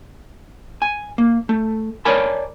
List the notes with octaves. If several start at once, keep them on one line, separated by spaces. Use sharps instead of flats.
G#5
A#3
A3
A#4 C#5 D5 G#5 A5 B5